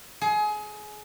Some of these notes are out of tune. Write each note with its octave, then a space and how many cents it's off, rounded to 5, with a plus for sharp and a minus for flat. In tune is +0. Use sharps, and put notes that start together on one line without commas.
G#4 +25